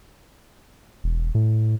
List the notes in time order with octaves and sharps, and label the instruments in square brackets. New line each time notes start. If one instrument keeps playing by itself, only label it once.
[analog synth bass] E1
A2